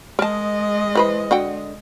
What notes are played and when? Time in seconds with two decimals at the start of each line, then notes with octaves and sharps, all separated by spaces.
0.19 G#3 A#4 D#5 A5
0.95 E3 B4 C5
1.31 D3 F#4 G5